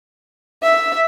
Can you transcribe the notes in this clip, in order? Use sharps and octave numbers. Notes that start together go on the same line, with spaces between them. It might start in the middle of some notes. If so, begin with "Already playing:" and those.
E5